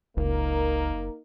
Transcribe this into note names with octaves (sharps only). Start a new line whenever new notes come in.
F#1 C#2 A#3 D#4 A#4